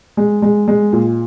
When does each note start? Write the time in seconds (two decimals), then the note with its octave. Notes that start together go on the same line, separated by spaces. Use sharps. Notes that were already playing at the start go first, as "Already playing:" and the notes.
0.17 G#3
0.42 G#3
0.68 G#3
0.93 A#2